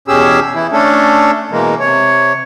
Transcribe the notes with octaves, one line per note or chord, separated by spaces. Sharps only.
E2 B2 C#4 G4 G#4 E6
E3 E4
A3 C#4 D4 A4
B2 E3 G#3 A#3
C3 C#5